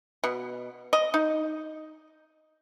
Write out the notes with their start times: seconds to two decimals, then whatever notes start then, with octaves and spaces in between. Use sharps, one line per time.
0.24 B2
0.93 D#5
1.14 D#4